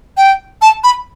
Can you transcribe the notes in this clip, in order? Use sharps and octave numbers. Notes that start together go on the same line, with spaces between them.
G5
A5
B5